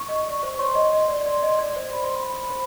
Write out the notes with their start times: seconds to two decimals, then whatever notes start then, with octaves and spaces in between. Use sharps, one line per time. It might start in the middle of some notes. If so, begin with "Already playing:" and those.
Already playing: C#6
0.09 D#5
0.26 D5
0.43 C5 C#6
0.59 C#5 C6
0.75 D#5
0.92 D#5
1.08 D5
1.26 D5
1.43 D#5
1.59 D5
1.76 C5
1.92 B5
2.04 C6
2.15 B5
2.50 C5